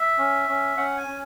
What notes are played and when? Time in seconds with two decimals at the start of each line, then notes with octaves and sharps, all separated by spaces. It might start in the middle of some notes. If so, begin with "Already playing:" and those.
Already playing: E5
0.18 C#4
0.48 C#4
0.77 C#4 F#5
0.97 G#5
1.07 C#4